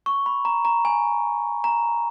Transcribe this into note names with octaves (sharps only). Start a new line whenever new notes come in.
C#6
B5
A#5
A#5
G#5
A#5